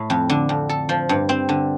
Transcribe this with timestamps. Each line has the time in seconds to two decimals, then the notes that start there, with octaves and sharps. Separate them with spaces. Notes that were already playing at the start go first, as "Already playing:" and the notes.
Already playing: A2
0.10 F2
0.30 D3
0.49 F2
0.69 A4
0.89 F3
1.09 G2
1.29 C4
1.49 D3